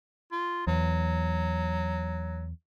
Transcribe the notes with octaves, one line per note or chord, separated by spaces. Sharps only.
F4
E2 F#3